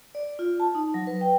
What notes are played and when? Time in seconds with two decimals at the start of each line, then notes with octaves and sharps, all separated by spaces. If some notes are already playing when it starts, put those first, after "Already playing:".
0.15 D5
0.39 F4
0.60 A5
0.75 D#4
0.94 F#3
1.07 B4
1.21 G5